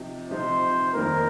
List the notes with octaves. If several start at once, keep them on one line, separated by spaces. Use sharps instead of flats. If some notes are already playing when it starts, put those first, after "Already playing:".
Already playing: C3 F3 D#4 G4
C3 F3 D#4 G4 C5
F1 D#2 D#3 G3 A#3 A#4